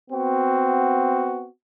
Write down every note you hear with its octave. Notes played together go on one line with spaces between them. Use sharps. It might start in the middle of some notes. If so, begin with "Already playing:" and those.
B3 C4 F#4